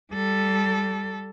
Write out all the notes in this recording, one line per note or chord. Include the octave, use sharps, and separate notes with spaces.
G3 A4